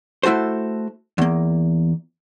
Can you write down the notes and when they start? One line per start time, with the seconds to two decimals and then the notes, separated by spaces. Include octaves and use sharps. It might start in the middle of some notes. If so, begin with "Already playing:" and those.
0.23 A3 E4 F#4 A4 C5
1.18 E2 A#3